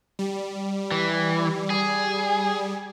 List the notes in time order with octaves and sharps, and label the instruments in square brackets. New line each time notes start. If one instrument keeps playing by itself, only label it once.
[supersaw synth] G3
[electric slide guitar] E3
G#4